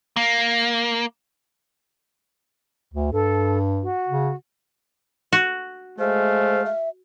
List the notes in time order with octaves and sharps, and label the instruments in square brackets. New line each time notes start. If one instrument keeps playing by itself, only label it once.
[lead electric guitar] A#3
[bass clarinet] D2
[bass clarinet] G2 [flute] A4
[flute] F#4
[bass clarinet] C#3
[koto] F#4
[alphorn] G#3 [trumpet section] A3 F5 [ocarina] C5
[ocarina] E5